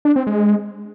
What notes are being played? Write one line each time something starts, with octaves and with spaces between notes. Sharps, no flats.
D4
C4
G#3